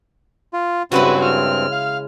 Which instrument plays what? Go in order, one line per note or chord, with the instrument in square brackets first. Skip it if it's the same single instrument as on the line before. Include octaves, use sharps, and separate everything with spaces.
[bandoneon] F4
[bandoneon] G2 C4 [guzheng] C#3 G#3 E4 [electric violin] F#4 B4
[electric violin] F6
[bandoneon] F5